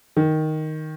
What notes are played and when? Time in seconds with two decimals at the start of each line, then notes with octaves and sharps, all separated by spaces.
0.16 D#3